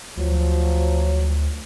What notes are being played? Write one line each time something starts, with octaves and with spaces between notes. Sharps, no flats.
D2 F3 F#3